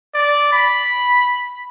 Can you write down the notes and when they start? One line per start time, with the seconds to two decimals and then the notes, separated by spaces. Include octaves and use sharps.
0.15 D5
0.53 B5